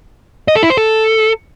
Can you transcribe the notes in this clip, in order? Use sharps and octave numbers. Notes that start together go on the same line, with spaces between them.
D#5
A4
E4
C5
A4